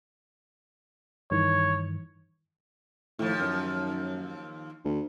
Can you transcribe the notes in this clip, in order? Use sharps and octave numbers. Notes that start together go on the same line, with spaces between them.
G2 D#3 E3 C#5
D#2 A2 F3
F#2
D2